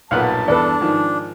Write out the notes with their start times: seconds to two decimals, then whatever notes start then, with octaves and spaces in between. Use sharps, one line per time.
0.11 B1 G2 A#2 B3 F5 F#5 A5 F#6
0.48 E2 D4 A4 B4 D5
0.81 G#2 D#3 F3